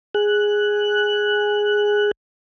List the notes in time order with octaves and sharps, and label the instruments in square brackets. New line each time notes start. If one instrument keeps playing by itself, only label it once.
[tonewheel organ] G#4 F#6